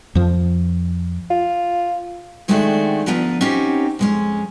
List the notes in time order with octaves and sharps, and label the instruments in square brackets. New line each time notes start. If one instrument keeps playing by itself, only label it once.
[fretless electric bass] F2 F3
[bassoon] F4
[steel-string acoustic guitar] D#3 G#3 A3 C4 D4 F#4
D2 F3 B3 B4 A#5
C4 C#4 D#4 F#4 G4
F2 G#3 C#4